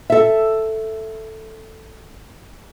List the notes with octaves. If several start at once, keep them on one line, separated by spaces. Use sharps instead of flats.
A4 E5